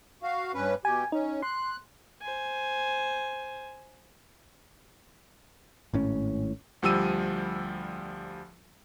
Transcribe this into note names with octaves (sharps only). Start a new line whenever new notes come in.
F#4 F5
G2 C#4 B4
B2 G4 G#5
C#4 D#4
C6 F#6
C5 G#5
G#1 A2 C#4
D2 F3 G3 E6 D#7